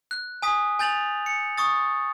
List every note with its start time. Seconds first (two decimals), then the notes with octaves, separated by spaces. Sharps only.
0.11 F#6
0.42 G#5 D#6 B6
0.79 G#5 G6 A6 F7 F#7
1.26 C#7
1.58 C#6 D#6 A6